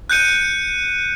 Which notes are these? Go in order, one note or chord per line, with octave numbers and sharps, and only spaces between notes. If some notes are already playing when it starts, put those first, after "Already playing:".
F#6 G6 C#7 D#7